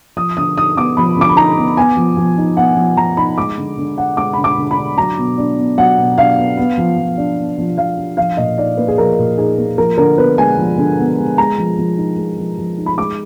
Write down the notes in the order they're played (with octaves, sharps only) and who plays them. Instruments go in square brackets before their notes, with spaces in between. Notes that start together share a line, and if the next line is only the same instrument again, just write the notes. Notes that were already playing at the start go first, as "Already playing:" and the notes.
[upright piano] F3 D#6
D3 D#6
D#4 D#6
B3 D6
F3 B5
D3 D6
B5
D#4 A#5
B3
B3 G#5
F3
F3
D#4
B3 F#5
F3
F3 A#5
D#4 B5
G#3 D6
D3
D3
D4 F#5
G#3 D6
D3 B5
D6
D3
B5
D4
F#3 A#5
B2
D4
B3
F#3 F#5
B2
D4 F5
B3
B3
F3
F3
D4
B3
F3
F3 F5
D4
F3 F5
A#2 D#5
D#4 D5
A#3 B4
G#4
F3 A#4
A#2
D#4 G#4
A#3
F3 A#4
D3 A#4
B3 B4
G#3 G#5
F3
D3
B3
G#3
G#3 A#5
F3
F3
D#4
G#3
F3
F3
D#4
B5
G#3 D6